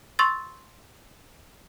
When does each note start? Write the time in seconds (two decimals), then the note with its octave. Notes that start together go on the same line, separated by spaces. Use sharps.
0.19 C6 C#6 E6 A6